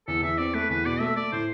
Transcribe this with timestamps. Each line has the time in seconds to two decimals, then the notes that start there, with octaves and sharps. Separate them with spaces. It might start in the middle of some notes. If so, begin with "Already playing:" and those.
0.07 E2 A4
0.22 E2 E5
0.38 C4 D5
0.54 A3 B4
0.70 E2 B4
0.85 B2 D5
1.00 A3 E5
1.16 A3 D5
1.32 A2 C5